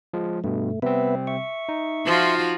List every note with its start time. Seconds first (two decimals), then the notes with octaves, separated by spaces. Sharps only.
0.14 F3 G#3
0.44 G2 B2 A3
0.82 C3 G3 B3 C4 B4 E5
1.27 E5 C#6
1.69 D#4
2.05 F3 F4 F#4